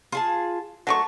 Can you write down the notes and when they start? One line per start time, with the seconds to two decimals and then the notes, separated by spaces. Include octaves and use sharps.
0.12 F4 G#4 A5
0.87 F#3 A3 A5 C#6